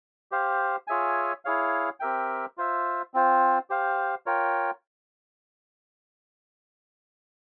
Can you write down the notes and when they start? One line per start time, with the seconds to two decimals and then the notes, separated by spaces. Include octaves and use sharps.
0.32 G4 C5 F5
0.87 F4 G#4 C#5 E5 G#5
1.45 E4 G#4 C#5 F5
2.00 C4 G4 A#4 E5 G5
2.57 F4 C5 E5
3.14 C4 F4 C5
3.70 G4 C5 F5
4.26 F4 A#4 C#5 G5